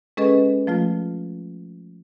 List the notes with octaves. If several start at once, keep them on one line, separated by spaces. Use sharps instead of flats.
G#3 C#4 G#4 A4 B4 D#5
F3 A3 F4